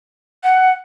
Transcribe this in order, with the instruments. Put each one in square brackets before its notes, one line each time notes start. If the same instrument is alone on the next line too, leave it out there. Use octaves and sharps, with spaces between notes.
[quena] F#5